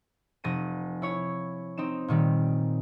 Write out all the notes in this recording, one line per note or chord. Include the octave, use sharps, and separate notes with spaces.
F1 A#6 D#7
E4 C#5
C4 D#4 E7
A#2 D#3 G3